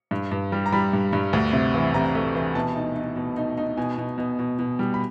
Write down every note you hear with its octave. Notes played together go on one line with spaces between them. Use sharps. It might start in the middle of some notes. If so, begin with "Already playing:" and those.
G2
G2
G3
A#5
G3 B5
G2
G2
D2
C3
E3
C3 A#5
A3
E3
B2 A5
D#4
D#4
B2
D#4
D#4
B2 G#5
B2
B2
B2
B2
G3
B5